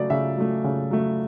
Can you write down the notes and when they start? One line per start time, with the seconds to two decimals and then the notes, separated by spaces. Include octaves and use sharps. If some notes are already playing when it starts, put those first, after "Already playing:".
Already playing: C#3 F#3 A3 D5
0.10 C#3 E5
0.38 F#3 A3
0.64 C#3
0.91 F#3 A3